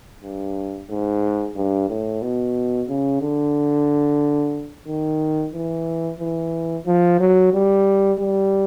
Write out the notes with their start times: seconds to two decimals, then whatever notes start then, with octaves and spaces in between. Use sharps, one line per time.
0.23 G2
0.90 G#2
1.56 G2
1.89 A2
2.22 B2
2.88 C#3
3.21 D3
4.87 D#3
5.53 E3
6.20 E3
6.86 F3
7.19 F#3
7.53 G3
8.19 G3